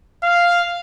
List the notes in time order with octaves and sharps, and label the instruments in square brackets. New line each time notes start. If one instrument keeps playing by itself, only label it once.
[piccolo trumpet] F5